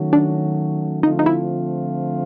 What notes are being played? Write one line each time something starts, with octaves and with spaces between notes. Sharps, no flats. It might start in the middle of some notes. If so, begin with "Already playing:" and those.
Already playing: D#3 F#3 A3 C#4 F#4
D4
D3 F3 A3 C4 D#4 F4
D#4
E4